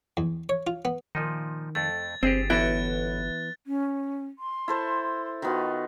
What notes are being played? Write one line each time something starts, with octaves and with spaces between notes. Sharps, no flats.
E2
C#5
F4
B3
A#2 D#3 F3 D#4
F2 A3 A6
G1 C4 G4 G#4 C5
A1 E3 B3 E4 F#4 G5 F#6 A6
C#4
C6
E4 A4 C5
D#3 B3 F4 F#4